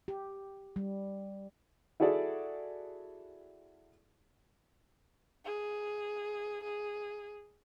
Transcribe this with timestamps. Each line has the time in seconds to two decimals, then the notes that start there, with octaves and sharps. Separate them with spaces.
0.08 G4
0.76 G3
2.00 E4 F#4 G#4 A4 D5
5.45 G#4
6.64 G#4